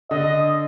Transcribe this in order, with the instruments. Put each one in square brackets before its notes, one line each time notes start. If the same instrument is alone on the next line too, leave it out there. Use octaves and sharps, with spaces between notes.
[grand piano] D3 [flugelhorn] D#5